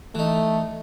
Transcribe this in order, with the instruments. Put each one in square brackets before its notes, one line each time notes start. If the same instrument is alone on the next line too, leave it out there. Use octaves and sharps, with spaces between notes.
[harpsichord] E3 D#4 [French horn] A3